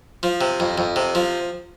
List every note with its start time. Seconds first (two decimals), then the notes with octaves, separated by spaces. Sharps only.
0.23 F3
0.41 C3
0.60 F2
0.78 F2
0.96 C3
1.15 F3